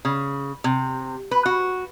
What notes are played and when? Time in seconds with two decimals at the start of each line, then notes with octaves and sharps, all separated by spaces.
0.05 C#3
0.64 C3
1.31 B4
1.46 F#4